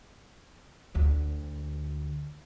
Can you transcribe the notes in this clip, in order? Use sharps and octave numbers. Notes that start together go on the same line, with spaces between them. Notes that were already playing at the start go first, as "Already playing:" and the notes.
D2 C4